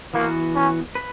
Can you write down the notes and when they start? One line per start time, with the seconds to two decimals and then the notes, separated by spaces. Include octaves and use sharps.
0.14 E3 A#3 B3 F#4
0.55 C#4
0.95 B4